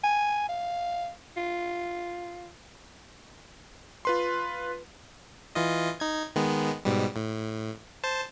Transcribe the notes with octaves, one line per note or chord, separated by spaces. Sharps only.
G#5
F5
F4
F4 B4 C6
E3 F4 D#5
D#4 G#6
D#3 G#3 B3
G#2 B2 G3
A2
C5 A5